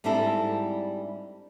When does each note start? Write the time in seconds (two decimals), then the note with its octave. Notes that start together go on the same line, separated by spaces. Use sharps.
0.04 G#2 G3 C4 D4 E4 A4